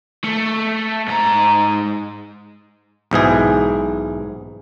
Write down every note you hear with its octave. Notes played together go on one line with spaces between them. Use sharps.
A3
G#2 A#5
B1 G#2 E3 G#4